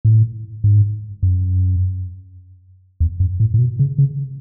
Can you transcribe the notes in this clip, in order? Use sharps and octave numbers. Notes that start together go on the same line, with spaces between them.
A2
G#2
F#2
E2
F#2
A2
A2
B2
C#3
C#3